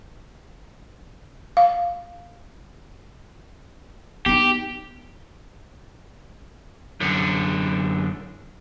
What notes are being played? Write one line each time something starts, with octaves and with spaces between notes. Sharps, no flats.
F5
B3 D#4 G4
F#2 D3